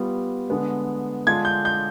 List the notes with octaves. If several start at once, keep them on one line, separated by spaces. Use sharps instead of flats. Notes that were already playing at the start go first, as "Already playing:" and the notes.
Already playing: G3 B3 F4
D3 G#3 B3
D3 G#3 D4 F4 G#6
G6
G6